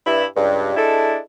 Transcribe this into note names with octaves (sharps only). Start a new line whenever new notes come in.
G2 E4
C#2 G2
G#3 D4 E4 A4